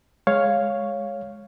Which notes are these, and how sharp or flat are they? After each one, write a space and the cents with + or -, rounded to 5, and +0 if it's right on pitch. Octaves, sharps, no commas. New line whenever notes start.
G#3 +5 C#5 +0 F5 +0